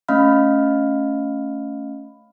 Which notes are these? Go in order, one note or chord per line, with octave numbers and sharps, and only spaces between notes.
A3 C#4 D#5 F5 B5 F6